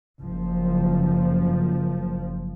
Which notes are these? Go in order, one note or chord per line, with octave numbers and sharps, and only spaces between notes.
F#1 F3